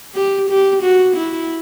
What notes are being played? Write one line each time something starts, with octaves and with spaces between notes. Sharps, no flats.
G4
G4
F#4
E4